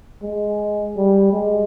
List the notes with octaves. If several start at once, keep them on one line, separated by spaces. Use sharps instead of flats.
G#3
G3
G#3